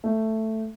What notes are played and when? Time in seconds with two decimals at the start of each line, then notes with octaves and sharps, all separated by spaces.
0.04 A3